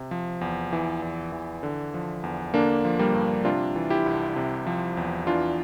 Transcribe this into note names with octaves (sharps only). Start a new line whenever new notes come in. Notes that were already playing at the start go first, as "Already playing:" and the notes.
Already playing: C3
F3
E2
E3
E2
E3
D3
F3
E2
D3 A#3 D4
F3
G3 A#3
G2
C3 D4 F4
E3
E4 G4
C2
C3
F3
E2
E3 D4 F4